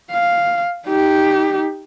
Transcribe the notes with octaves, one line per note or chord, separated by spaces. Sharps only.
F5
D#4 G4